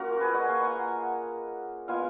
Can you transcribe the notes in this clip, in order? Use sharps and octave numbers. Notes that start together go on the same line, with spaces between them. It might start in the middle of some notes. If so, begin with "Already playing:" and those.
Already playing: A#3 C#4 F4 F#4 A#4
G#4 B4
D#5 F#5
F5 G#5
F#5 A#5
G#3 B3 F4 F5 G#5